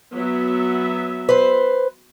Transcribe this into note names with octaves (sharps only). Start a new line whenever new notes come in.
F#3 B3 E5
B4 C5